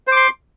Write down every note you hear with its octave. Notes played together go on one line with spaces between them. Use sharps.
C5 C6 D6